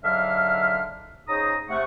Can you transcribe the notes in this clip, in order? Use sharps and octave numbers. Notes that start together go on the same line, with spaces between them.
G#2 D3 F#3 E5 F5 F6
G#2 C#3 D#4 G#4 A#5 D#6
C3 A3 F#5 C#6